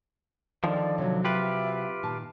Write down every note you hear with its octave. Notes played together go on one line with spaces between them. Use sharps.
D3 D#3 F3 A#4 D5
C3 F#3 C#5
F4 G4 B4 E5
A#2 D#3 A5